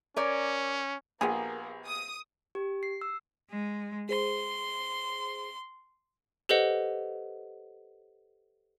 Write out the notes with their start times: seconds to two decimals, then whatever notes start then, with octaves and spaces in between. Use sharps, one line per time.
0.16 C#4 A#4 C#5 D5
1.21 A#1 A#3 B3 G4 G#4
1.85 D#6
2.55 G4
2.83 C7
3.01 E6
3.50 G#3
4.09 G#4 C5 C6
6.49 G4 A4 B4 C5 D#5 F#5